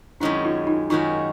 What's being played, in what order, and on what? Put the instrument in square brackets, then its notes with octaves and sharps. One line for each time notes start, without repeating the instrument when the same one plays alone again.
[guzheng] F#2 D#3 G#3 C#4 F#4 [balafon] D4 E4
[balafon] D#4 F4
D#4 F4
[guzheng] F#2 D#3 G#3 C#4 F#4 [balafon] D#4 F4